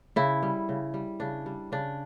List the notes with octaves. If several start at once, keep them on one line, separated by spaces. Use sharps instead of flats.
C#3 E4
G3
C#3
G3
C#3 D4
G3
C#3 D4